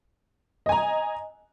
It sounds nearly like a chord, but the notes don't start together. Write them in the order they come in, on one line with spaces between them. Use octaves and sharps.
D#5 G#5 A#5